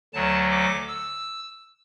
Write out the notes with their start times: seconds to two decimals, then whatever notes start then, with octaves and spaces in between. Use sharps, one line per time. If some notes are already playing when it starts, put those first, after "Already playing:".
0.14 D2 D3 F#3 A5
0.51 D6
0.88 E6